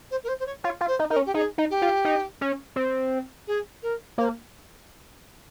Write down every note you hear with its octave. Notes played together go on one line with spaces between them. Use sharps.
C5
A#4
C5
C5
C#5
F4 C#5
F4
C5
D#4
D#4 A#4
C#4
G4
D#4 G#4
D#4
G4
F4
D#4
C#4
C4
G#4
A#4
A#3 C5